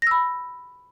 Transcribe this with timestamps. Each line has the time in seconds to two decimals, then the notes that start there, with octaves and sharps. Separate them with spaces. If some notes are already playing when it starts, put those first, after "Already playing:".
0.02 A#6
0.07 E6
0.11 B5